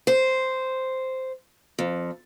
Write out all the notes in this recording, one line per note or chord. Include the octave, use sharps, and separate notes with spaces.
C5
F2